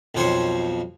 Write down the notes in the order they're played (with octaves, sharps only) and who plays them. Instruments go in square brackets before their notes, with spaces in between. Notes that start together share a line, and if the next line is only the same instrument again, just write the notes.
[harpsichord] B1 F2 F3 C5 C#5 C6